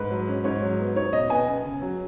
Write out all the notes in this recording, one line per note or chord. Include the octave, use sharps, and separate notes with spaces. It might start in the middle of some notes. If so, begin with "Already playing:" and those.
Already playing: G#2 B4
F#3
C#4
G#2 C#5
F#3
B3
D#4 C#5
B2 D#5
B3 G#5
F#2
C#3
F#3